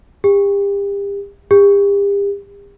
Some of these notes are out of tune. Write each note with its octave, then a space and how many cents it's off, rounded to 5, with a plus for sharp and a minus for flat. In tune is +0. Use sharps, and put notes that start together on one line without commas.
G4 +35
G4 +40